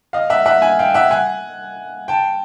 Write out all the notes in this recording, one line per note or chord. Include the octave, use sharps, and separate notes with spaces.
D#5 F5
E5 F#5
E5 F#5
F#5 G#5
F5 G5
E5 F#5
F#5 G#5
G5 A5